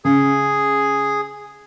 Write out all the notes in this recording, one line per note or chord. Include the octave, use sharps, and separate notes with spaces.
C#3 G#4